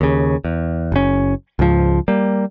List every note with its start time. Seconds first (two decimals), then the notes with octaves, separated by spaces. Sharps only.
0.01 D#2 C#3
0.44 E2
0.92 F#1 C#4
1.59 C#2 G#2 F3
2.08 G3 A#3